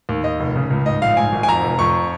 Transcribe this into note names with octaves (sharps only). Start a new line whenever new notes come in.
D#2
D#2 D#5
F1
C#3
C#2
G#2 D#5
A#1 F5
G#2 G#5
G#1
G#5
F2 A#5
F1
F2 C#6